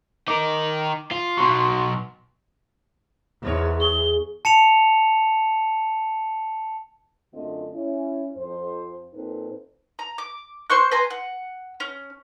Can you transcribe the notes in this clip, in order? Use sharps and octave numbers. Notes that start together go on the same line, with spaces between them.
D#4 A#4 D6
F4
B2 F#3 C6 C#6
E2 G#2 G3 C#5
G#4 G7
A5 C#7 E7 F7
F#2 D3 A3 C4 F4 D#5
C#4 E4
F2 C5
A#2 C4 D#4 A4 B4 C5
A#5
D6
C5 C6 C#6 F#6
B4 G#5 A#5 C6
F#5
C#4